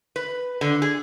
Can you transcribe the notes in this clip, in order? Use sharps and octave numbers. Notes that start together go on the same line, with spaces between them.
B4
D3
G#4